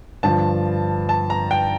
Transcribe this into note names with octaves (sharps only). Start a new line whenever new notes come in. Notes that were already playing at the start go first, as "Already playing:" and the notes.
G2 D3 F3 A5
A5
A#5
G5